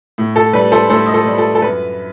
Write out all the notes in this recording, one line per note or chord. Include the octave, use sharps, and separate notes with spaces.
A2
A4
G3 B4
A4 C5
A2 A4 C5
D#5
A4 C5
G3
A4
A4
F#2 B4